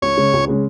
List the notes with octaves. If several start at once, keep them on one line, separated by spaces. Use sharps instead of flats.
C#2 C#5
C#3 G#3 C#4
C#2
C#3 G#3 C#4